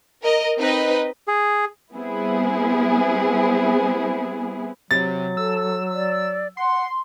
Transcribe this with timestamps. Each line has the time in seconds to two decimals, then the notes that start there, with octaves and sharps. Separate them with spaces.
0.23 A#4 D#5
0.58 C4 D#4 B4 D#5
1.28 G#4
1.92 G3 B3 C4 E4 G#4
4.91 C3 F#3 A6
5.37 A4 E6
5.94 D5
6.57 F#5 C6